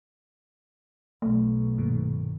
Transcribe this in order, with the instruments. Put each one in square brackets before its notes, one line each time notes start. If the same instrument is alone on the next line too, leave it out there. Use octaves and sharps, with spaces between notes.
[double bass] B1 [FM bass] A3
[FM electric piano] G2 A#2 D#3